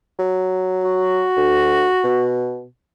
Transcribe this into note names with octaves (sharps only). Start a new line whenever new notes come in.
F#3
F#4
D2
B2